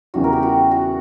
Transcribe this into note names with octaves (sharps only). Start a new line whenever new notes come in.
E2 C#3 E3 G3 F#4
A#4
G4
F#4
F#4